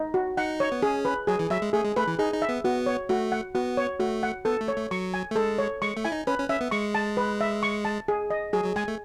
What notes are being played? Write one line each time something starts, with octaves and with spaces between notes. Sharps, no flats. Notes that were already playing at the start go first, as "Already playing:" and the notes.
Already playing: D#4
F#4
D#4 F#5
C#5
B3
C#4 G#4
B4
F#3 G#4
E3
F#3 E5
G#3
A3 G#4
G#3
A3 B4
E3
D#4 G#4
D#4
E5
B3
B3 F#4
C#5
A3 F#4
F#5
B3 F#4
C#5
A3 F#4
F#5
B3 A4
A3
C#5
A3
F#3 C#6
G#5
A3
G#3 A4
C#5
G#3 C#6
A3
E4 G#5
D#4
C#4 B4
C#4
C#4 E5
B3
G#3 C#6
A5
B4
E5
C#6
A5
G#4
D#5
F#3 G#4
F#3
G#3 G#5
A3